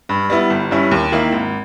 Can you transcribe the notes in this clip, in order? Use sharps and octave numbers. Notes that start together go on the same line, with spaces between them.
G2
G3 B3 E4
G1
G2 G3 C#4 E4
D#2
D#3 A#3 E4
G#1